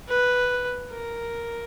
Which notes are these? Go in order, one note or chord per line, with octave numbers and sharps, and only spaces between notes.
B4
A#4